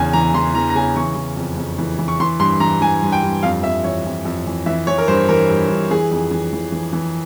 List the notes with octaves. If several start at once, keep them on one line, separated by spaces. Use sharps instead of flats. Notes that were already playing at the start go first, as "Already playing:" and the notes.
Already playing: E2 C#3 G#5
E3 A#5
E3 C6
E3 A#5
A#5
C#3 G#5
E3 C#6
E3
F2
F2
E3
E3
C#6
E3 C6
G2 C6
E3 A#5
E3 G#5
G2
G5
G2
F2 F5
F2 E5
E3 C#5
F2
F2
E3
E3 E5
E3 C#5
A#4
G2 C5
E3 A#4
G2
G2
E3 G#4
F2
E3
E3
E3
E3